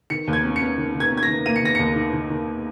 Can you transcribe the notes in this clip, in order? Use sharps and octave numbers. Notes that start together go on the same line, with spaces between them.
D#3 C#7
D#2
G#6
C#4
C#7
C#4
D#3
D#3
G#6
C#4
G#6
A#6
D#3
A#3 D#7
C#7
D#3 A#6
D#2 C#7
D#3
D#3
D#3